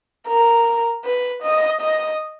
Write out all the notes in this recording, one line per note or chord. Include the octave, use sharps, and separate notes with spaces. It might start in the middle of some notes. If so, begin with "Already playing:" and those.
A#4
B4
D#5
D#5